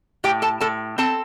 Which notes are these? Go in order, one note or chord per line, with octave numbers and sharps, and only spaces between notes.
A2 G4 G5
A4 A5
A2 A4 A5
C4 A4 A5